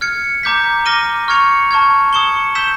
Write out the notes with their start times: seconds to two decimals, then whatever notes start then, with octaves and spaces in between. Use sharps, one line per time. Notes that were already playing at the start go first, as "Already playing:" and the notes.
0.01 F6 G#6 C#7
0.43 A#5 D6 G6 B6
0.85 D6 F6 A#6 D#7 G7
1.28 C#6 F6 G#6 C#7 F7
1.71 A5 C#6 F6 G#6
2.13 D#6 G#6 C#7 E7 G7
2.55 E6 G6 B6 E7 G7